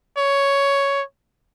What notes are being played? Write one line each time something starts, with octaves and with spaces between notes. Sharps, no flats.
C#5